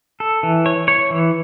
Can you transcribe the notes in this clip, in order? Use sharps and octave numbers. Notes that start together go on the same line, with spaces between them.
A4
E3
C#5
C#5
E3